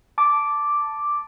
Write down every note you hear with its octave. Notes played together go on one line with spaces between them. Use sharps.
A5 D6